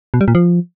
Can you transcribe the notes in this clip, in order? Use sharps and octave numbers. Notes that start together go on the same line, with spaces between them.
B2
G3
A#2
F3